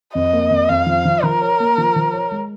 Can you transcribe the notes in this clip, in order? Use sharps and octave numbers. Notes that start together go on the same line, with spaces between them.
F2 D#5
A#3
F2
F2 F5
F3
F3
F3 A#4
C#5
A#3
F3
F3
C#5
G#3